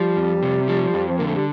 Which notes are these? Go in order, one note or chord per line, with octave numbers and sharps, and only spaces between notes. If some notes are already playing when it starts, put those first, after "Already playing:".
Already playing: F3 G3
F2
C3
F3
F2
C4
D3 A#3
A3
G3